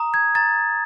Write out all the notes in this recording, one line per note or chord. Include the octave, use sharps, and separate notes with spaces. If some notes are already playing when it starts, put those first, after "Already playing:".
Already playing: A#5 D#6
G#6
A#5 A6